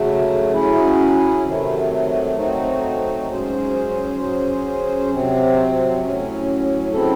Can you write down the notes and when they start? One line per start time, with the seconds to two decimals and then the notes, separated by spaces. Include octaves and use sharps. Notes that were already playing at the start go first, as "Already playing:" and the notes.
Already playing: C#3 F#3 A3
0.53 F#3 C#4 E4 G#4
1.44 C3 D#3 F#3 A3
2.36 F#3 A3 C4 D#4 F#4
3.27 G#2 F#3 C#4 G#4 C5
4.18 F#3 C#4 G#4 C5
5.10 C3 F#3 C4
6.01 A2 F#3 C#4
6.93 C#3 F#3 C4 E4 A4